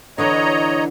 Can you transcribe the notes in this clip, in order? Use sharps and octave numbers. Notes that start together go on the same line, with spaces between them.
D3 E3 D4 C#5 D#5 A#5